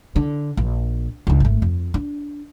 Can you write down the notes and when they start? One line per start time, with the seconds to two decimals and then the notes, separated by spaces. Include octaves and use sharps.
0.16 D3
0.57 A#1
1.27 C#2 D4
1.40 G#1 A3
1.62 F2
1.94 D4